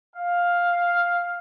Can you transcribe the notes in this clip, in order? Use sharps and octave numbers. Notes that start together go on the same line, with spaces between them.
F5